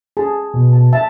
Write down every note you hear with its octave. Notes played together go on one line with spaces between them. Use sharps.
G#4 A5
B2
A5
E5 A5